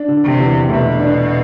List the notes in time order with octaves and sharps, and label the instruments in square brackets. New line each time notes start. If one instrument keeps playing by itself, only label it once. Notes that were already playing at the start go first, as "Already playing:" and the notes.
Already playing: [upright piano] D4
D3
[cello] C3
[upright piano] E2
[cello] B2 [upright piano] A3
[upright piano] D4